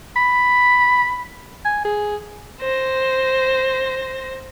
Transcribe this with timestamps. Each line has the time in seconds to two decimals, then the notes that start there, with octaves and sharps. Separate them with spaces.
0.16 B5
1.65 G#5
1.85 G#4
2.61 C5 A#6